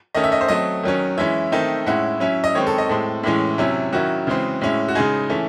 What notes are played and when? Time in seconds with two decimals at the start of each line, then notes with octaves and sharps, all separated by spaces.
0.15 D#3 A3 C#4 D#5
0.24 E5
0.32 D#5
0.41 C5
0.48 F#3 A3 C4 D#5
0.83 D#3 F#3 C#4
1.18 E3 G#3 C#4 E4 E5
1.52 D#3 A3 C4 D#4
1.86 A2 G#3 C#4 E4 F#5
2.20 F#3 C#4 E4 E5
2.44 D#5
2.55 D#3 G#3 C4 C#5
2.67 A4
2.78 D#5
2.89 A2 G#3 C4 A4
3.23 A2 E3 G#3 C#4
3.58 C3 F#3 C#4 E4
3.93 D#3 F#3 C#4 E4 F#4
4.27 C#3 E3 G#3 C4
4.61 A2 G#3 C#4 E4
4.88 F#4
4.95 C#3 G#3 D#4 G#4
5.30 E3 A3 C#4